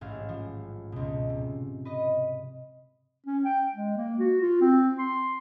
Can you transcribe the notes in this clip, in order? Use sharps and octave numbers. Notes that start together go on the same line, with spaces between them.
A1 G#2 G#4 F5
F3
C#2 B2
C3
B4 D#5
C#4
G5
G#3
A#3
F#4
F4
C4
C6